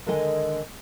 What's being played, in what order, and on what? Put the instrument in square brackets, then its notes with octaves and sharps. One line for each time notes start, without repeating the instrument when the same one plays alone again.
[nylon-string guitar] D3 D#3 G#3 A4 D#5 G#5